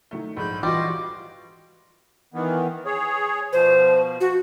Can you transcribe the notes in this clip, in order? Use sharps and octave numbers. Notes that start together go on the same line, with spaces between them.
D#3 F#3 A3
A#1 G#2 G#3 B5 G6
E3 G3 F4 F#4 D#5 C6 D6
D#3 E3 B3
G#4 C#5
B2 F3 C5
F#4